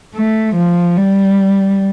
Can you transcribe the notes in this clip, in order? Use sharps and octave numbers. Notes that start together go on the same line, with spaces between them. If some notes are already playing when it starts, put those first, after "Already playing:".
A3
F3
G3